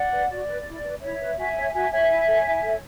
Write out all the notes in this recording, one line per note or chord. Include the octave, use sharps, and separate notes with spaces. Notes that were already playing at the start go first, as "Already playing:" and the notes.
Already playing: D5 F#5
B4
F#4 D5
B4
E4
B4
E4 C#5 E5
B4
F#4 E5 G#5
C#5
F#4 E5 G#5
C#5 E5 G#5
E4
A4 C#5
E4
A4 C#5